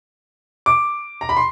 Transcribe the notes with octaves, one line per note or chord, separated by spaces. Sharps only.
D6
A#5
B5
C6